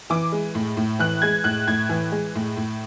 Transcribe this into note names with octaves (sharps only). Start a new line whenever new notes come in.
E3 D6
G#3
A2
A2
E3 F#6
G#3 G#6
A2 F#6
A2 G#6
E3
G#3
A2
A2